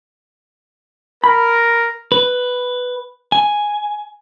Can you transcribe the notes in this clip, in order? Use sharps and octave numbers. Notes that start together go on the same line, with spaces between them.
A#4 B5
B4
G#5